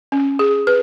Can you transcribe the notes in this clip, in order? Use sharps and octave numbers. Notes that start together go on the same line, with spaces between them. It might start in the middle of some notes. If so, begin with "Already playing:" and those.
C#4
G#4
B4